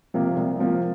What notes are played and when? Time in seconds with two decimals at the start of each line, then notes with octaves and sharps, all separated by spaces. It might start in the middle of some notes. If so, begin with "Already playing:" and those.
0.14 C3 F3 A#3
0.36 C2
0.58 C3 F3 A#3